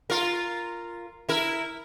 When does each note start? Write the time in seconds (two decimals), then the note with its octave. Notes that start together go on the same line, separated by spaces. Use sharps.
0.10 F4 A#4
1.29 E4 A#4